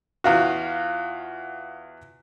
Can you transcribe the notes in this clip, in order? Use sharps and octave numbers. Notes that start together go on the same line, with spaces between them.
E2 F4 F#4